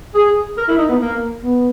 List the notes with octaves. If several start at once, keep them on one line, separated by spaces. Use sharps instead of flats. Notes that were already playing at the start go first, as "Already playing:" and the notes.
G#4
A#4
E4
D#4
B3
A#3
B3